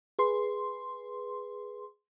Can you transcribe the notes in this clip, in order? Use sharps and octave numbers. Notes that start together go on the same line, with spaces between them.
G#4 B4 C6